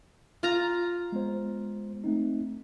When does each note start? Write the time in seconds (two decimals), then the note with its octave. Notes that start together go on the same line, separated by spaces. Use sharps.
0.43 F4 A#5
1.12 G#3 B3 C5
2.04 A3 C4 D#4